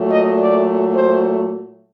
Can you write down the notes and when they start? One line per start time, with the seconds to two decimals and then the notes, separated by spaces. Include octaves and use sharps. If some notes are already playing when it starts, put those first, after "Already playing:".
Already playing: A#2 F#3 A3
0.11 D#5
0.39 D5
0.96 C5